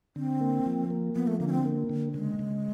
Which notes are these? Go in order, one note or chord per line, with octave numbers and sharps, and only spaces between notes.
D3 C4
A#3
F3
A#3
F3 B3
A3
D3 A#3
C#4
C4
A#3
D3
C#3 G#3
C#3